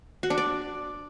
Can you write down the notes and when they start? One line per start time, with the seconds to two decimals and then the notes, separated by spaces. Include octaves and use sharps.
0.23 F#4
0.30 D4
0.38 D5